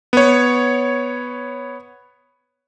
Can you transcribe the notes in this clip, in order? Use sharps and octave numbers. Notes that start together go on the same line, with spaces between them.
B3 C#5